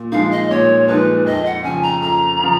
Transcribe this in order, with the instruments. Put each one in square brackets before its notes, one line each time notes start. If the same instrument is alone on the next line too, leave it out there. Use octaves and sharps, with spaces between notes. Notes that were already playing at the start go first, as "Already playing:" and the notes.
Already playing: [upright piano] A#2
[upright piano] F3 G#3 D#4 [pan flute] F5
[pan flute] D#5
[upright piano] A#2 [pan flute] C#5
[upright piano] F3 G#3 D#4 [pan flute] B4
[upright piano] F2 [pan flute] D#5
[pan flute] F#5
[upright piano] C#3 F3 [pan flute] G#5
[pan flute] A#5
[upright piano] F2 [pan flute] A#5
[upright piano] C#3 F3